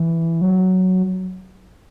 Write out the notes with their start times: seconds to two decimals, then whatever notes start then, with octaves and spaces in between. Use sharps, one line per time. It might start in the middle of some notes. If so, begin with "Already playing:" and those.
Already playing: E3
0.41 F#3